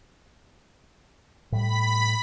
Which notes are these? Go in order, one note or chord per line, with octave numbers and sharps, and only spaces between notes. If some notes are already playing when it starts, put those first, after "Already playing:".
A2 G3 B5 B6